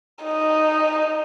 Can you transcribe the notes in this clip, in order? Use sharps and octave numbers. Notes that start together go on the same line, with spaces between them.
D#4